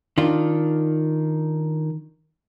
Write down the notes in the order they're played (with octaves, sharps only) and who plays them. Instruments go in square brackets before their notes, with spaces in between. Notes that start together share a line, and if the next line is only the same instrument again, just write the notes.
[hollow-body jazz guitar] D#3 D4 F4